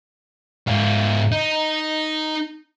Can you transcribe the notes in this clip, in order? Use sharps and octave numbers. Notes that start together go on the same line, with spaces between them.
G#2 F4
D#4